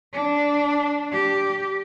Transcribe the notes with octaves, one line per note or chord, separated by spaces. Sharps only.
D4
G4